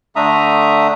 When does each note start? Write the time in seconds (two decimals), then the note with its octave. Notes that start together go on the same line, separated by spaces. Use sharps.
0.16 D3 A3 D4 E5 A#5 D#6